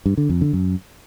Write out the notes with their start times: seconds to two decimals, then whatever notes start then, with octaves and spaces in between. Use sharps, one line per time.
0.06 G2
0.17 D3
0.29 F2
0.41 D3
0.53 F#2